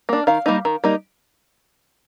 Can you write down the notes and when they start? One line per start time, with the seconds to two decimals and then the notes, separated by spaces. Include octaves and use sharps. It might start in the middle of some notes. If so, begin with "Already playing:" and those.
0.09 A#3 D4
0.27 D#3 F5
0.46 G3 A#3 D#4
0.65 D#3
0.84 G3 A#3 D#4